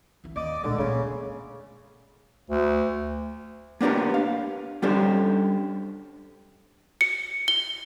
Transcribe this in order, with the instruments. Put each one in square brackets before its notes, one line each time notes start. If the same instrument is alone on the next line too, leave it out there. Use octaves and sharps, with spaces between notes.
[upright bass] D3 E3
[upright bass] D#2 [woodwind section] D5 D#5 D6
[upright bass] A#2 G#3 [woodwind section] D3
[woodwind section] C#3 [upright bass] A#3 D4
[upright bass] C4
[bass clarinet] D2
[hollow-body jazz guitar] A#3 B3 D4 G4 A#4
F5
G3 C#4 D4 G4 A4 C5
[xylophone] C#7
G7